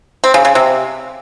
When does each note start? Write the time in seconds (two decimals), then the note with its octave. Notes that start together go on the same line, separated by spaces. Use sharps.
0.24 C4
0.34 C#3
0.45 C#3
0.55 C3